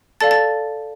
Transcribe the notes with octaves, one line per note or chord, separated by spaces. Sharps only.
A4 D5 F5 A5 A6
A5 A6